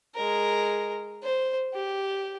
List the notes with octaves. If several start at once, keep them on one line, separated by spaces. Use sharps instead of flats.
G#3 A#4
C5
G4